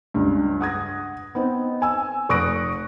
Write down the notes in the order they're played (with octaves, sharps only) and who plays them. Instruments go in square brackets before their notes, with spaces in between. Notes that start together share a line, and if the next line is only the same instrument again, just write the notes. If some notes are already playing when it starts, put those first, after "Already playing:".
[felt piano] C#2 G2
F#5 D#6 G#6 A#6
B3 C4 D#4
G#5 E6
F1 C#6 D#6 F#6 A#6 D7